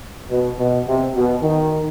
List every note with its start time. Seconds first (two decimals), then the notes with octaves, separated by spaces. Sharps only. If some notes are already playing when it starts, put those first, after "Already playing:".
0.30 B2
0.59 B2
0.87 C3
1.15 B2
1.43 D#3